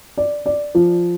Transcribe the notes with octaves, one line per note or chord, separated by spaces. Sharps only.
D5
D5
F3